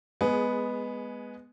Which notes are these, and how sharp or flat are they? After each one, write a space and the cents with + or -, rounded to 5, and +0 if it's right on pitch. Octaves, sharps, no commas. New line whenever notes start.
G#3 +0 B3 +0 G#4 +20